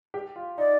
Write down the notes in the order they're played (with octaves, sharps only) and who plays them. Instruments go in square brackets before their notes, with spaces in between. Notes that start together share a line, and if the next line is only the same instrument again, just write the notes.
[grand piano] G4
F4
[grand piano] D#4 [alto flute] D5